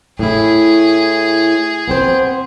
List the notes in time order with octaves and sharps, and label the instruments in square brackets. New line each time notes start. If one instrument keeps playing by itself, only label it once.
[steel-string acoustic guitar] A2 E4 [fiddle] G#4
[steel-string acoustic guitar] B3 C4 C5